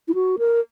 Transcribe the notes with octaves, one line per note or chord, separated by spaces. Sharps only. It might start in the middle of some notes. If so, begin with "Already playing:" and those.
E4
F#4
A#4